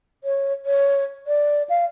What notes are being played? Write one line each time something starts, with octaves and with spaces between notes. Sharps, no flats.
C#5
C#5
D5
F5